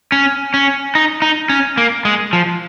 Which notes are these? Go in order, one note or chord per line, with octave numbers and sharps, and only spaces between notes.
C#4
C#4
D#4
D#4
C#4
A#3
G#3
F3